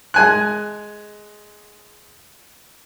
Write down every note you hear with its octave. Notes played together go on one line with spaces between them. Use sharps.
G#3 G#5 F#6